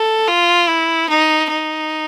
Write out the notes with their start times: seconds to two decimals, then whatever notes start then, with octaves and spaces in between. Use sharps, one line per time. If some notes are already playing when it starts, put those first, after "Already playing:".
Already playing: A4
0.28 F4
0.68 E4
1.10 D#4
1.51 D#4